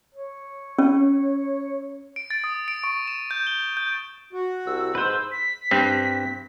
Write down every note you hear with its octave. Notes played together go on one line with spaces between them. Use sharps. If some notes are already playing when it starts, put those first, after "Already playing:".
C#5
C#4
D7
A6
D#6
D7
C#6
E7
G6
G7
G6
F#4
C2 E6
G#2 B4 C5
B6
G2 C4